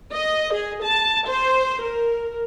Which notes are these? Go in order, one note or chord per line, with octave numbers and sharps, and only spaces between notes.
D#5
G#4
A5
C5
A#4